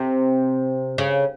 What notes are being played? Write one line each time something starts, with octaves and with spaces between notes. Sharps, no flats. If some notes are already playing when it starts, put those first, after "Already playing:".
Already playing: C3
C#3